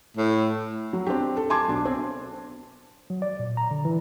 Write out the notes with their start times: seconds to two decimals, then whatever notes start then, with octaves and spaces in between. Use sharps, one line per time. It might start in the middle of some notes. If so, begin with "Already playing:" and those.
0.17 A2
0.93 F#3
1.07 C4 D4 G4
1.37 A4
1.50 G#5 A5 C6 D6 G#6
1.68 B1 D4
1.85 C4
3.10 F#3
3.22 D5
3.39 A#2
3.57 A#5
3.71 D3
3.85 E3